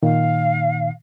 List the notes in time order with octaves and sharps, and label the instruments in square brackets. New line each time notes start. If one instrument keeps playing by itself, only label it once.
[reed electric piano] A#2 D#3 [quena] F5